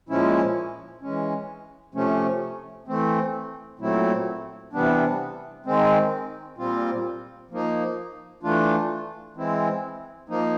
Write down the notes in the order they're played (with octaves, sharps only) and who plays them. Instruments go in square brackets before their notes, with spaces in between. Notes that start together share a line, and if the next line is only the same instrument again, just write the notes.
[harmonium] A#2 F3 G#3 C#4 E4
E3 G#3 C#4
C3 F3 A3 C#4
E3 A3 C4
A#2 F#3 A3 C4 E4
C3 E3 G3 B3 D4
D#3 G#3 C4
A#2 G3 C4 F4
F3 A#3 D#4
E3 A3 D4 F4
E3 G#3 C4 E4
F3 A#3 D#4